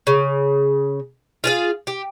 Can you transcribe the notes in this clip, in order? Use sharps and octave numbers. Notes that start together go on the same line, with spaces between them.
C#3
F4 G#4 F5
G4